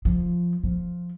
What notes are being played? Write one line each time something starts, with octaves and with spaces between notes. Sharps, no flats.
F3
F3